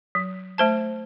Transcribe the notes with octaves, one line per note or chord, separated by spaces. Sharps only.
F#3
A3 C5 A5